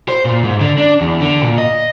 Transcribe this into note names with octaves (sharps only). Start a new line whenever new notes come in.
C5
A#2
G#2
D3
D4
E2
D3
A#2
D#5